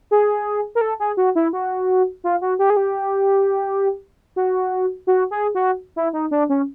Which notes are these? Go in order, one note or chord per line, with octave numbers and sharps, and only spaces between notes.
G#4
A#4
A4
G#4
F#4
E4
F#4
F4
F#4
G4
G#4
G4
F#4
F#4
G#4
F#4
E4
D#4
D4
C#4